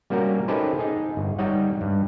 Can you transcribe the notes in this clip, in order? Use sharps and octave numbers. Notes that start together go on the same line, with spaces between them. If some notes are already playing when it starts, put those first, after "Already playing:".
G3 A#3 C#4 F#4 A#4
C#4 D#4 G4 A4 B4 C5
D#4 G#4
G1
G3 D#4 C#5 D#5 F#5
G2